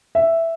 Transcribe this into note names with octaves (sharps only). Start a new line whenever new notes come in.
E5